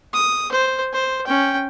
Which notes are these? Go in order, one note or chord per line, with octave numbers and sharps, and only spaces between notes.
D#6
C5
C5
C#4 G5